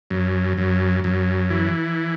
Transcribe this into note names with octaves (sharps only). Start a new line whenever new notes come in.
F#2
F#2
F#2
E3